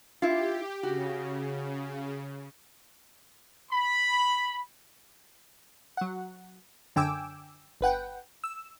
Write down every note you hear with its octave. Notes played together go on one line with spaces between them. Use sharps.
E4 F4 G4
C#3 F#4
B5
F#3 F#5
F#2 D3 G5 G#5 D6 E6
G1 B4 F#5 G5
E6